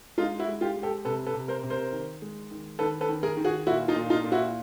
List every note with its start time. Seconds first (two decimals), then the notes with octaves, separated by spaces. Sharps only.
0.18 G#3 D#4 F4
0.39 E4 F#4
0.48 G#3
0.61 F4 G4
0.77 G#3
0.83 G4 A4
1.05 C3 A4 B4
1.26 A4 B4
1.34 C3
1.48 A#4 C5
1.63 C3
1.70 A#4 C5
1.92 D#3
2.22 G#3
2.51 D#3
2.79 D#3 A4 B4
3.01 A4 B4
3.09 D#3
3.23 G#4 A#4
3.37 D#3
3.45 F#4 G#4
3.66 A#2 E4 F#4
3.88 D#4 F4
3.96 A#2
4.10 D#4 F4
4.24 A#2
4.32 E4 F#4